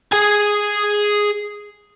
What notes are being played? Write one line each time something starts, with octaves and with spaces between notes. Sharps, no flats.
G#4 G#5